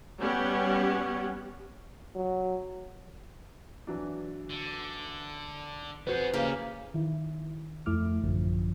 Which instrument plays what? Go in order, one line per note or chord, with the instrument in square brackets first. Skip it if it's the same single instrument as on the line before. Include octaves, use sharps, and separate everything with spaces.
[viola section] G3 B3 C#4 G4 C#5 F#5
[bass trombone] F#3
[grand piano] E3 F#3 D4
[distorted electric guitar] D3
[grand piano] F2 F#4 G6 [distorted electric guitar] B3 G#4 [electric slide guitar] B4 C5
[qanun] C#3 A#3 [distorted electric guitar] G4 D#5
[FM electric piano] D#3 E4
F2 A3 E4 D6 F6
A1 F#2 D3 F3